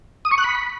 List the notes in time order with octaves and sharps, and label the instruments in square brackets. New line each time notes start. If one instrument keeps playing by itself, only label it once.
[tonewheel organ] D#6
C#6
F#6
B5